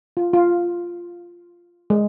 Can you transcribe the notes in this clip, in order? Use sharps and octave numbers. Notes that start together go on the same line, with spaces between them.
F4
F4
G#3